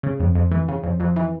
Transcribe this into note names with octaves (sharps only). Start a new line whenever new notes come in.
C#3
F2
F2
E3
C#3
F2
F2
E3